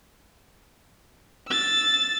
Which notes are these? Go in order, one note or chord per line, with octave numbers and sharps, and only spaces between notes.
E6 A6